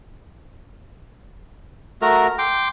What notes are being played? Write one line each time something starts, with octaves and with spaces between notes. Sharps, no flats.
A3 F#4 A#4 A#5
G5 C6 D6